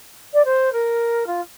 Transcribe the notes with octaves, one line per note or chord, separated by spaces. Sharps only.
D5
C5
A#4
F4